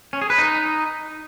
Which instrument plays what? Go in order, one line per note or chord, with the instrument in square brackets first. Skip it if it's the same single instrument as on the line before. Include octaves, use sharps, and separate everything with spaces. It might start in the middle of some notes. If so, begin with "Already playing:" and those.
[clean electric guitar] C#4
G#4
B4
D#4